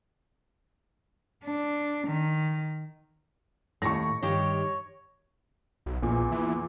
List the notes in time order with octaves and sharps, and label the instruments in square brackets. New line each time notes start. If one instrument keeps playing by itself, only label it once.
[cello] D4
D#3
[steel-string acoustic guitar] D#2 A2 [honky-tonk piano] C#6 A#6
[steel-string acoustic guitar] G2 D#3 G4 [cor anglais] C#5
[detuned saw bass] B1
[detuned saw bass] A#1 [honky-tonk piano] E2 A#2
[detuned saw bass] E3